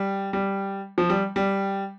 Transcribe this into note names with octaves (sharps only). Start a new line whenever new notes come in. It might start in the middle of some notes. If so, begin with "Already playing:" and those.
Already playing: G3
G3
F3
G3
G3